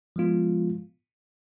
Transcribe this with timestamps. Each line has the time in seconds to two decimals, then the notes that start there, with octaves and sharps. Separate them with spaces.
0.16 F3 G#3 B3 F4